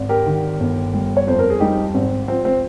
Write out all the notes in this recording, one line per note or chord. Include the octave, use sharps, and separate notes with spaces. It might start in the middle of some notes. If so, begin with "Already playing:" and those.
Already playing: G#1
G4 A#4
D#3
G1
G3
C#5
F2 C5
A#4
G#4
G3 D#4 G4
G#1 C4
F3 C4
C4